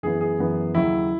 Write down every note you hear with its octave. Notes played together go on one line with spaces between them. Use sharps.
F#2 E3 B3 G#4
G#4
F#2 E3 B3
D#2 C#3 F#3 E4